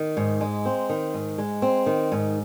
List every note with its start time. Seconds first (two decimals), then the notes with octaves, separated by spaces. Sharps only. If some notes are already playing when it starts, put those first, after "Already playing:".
Already playing: D#3
0.17 G#2
0.41 G#3
0.65 C4
0.89 D#3
1.14 G#2
1.38 G#3
1.62 C4
1.86 D#3
2.12 G#2